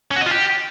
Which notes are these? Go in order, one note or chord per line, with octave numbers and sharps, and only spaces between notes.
C#4
F#4
D#5
F4
G4